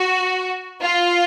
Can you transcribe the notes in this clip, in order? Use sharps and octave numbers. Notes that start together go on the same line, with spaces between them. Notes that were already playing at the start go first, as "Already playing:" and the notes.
Already playing: F#4
F4